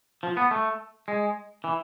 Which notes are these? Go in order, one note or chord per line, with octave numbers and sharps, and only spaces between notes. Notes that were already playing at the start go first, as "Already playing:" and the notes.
F3
B3
A3
G#3
E3